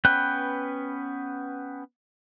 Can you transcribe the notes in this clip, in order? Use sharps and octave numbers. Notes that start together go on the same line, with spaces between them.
B3 C#4 B4 G5 F#6